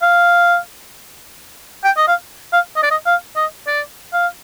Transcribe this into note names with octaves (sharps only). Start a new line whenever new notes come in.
F5
G5
D#5
F5
F5
D#5
D5
D#5
F5
D#5
D5
F5